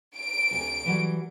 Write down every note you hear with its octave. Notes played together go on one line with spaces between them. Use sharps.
D7
D2 C3 G#5
E3 F#3 G3